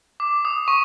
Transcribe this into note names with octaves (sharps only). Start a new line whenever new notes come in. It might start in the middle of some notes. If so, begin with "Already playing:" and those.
D6
D#6
C#6